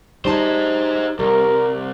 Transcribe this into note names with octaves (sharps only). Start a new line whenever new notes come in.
G3 D#4 G#4 C5 A5
C2 G3 A#4